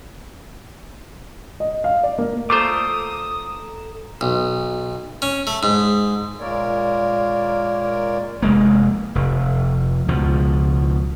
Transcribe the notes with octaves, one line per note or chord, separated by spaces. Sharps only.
D#5
F5
D5
A#3
A3 F4 A4 C5 A#5 D6 D#6 E7
B1
C#4
A3
G#2
A#2 G#3 A#3 A#4 C#5 D5
F1 G#3 A#3
F1
C#2 B2 F3